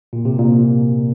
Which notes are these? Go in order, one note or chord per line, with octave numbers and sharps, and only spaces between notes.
A#2
C3
A#2